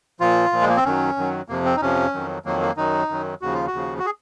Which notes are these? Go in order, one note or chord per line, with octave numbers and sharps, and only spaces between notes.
A#2 F3 F4
A#2 F3
G#3
A#3
C4
F#2 D#3 F#3 C#4
F#2 D#3 F#3
F2 C3 F3 A#3
C4
D#4
F2 C3 F3 C#4
F2 D#3 F#3
F2 D#3 F#3 A#3
A#3
F#2 D#3 F#3 D#4
F#2 D#3 F#3
D#2 C#3 F3 F#4
F4
F#4
D#2 C#3 F3
F#4
G#4